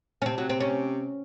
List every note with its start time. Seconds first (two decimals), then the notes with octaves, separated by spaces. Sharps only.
0.22 C#4
0.26 C3 C4
0.38 F#3
0.49 C4
0.60 C#4